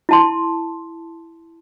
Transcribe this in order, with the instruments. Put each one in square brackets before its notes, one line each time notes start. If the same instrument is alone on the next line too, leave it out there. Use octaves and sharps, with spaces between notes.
[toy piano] E4 A5 C6